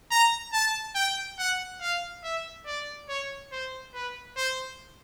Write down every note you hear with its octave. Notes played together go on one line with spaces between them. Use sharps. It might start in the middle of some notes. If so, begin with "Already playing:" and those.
A#5
A5
G5
F#5
F5
E5
D5
C#5
C5
B4
C5